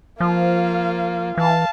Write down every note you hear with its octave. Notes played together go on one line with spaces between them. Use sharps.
F3 A#3 F4
E3 F5 A5